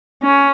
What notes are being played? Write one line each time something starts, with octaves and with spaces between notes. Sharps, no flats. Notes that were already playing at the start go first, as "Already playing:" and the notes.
C#4